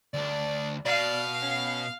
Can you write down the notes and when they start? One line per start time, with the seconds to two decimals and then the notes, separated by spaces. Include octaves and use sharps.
0.14 D2 D4 D5
0.86 B2 D5 F5
1.42 C#4